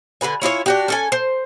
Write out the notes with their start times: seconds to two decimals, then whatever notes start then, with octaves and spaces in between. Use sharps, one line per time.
0.21 D3 F#4 B4 G#5
0.42 C#4 E4 F4 C#5
0.66 D4 F#4 G4
0.88 C#4 A4 G#5
1.12 C5